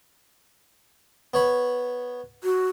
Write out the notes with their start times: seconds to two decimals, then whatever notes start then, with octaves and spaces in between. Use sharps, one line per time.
1.34 B3 C#5 B5
2.44 F#4